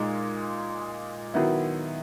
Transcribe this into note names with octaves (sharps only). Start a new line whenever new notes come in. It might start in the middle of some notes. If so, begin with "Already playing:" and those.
Already playing: A#2 G#3 D#4
D#3 F#3 B3 E4